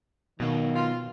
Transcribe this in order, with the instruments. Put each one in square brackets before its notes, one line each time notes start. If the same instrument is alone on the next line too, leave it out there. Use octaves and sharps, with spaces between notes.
[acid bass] B2 [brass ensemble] D#3 [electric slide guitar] F#3 B3 F5
[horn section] F4